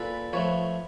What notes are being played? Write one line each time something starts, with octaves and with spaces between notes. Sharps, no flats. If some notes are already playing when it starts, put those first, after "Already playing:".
Already playing: A#2 A4 B4
F3 A3 B4 C#5